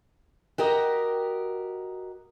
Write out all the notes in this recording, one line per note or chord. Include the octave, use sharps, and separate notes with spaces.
F#4 G4 A#4 D#5